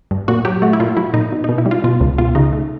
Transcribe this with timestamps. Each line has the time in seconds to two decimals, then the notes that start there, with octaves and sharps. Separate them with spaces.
0.11 G2
0.28 A#2 F#4
0.45 F#3 G4
0.62 A3 F#4
0.73 E4
0.80 A#2 F4
0.97 F#3 E4
1.14 A#2 D#4
1.32 B2
1.44 B2 D#4
1.58 E4
1.66 G3
1.71 F4
1.84 B2 F4
2.00 C#2
2.18 B2 F4
2.35 C#3 D#4
2.53 A3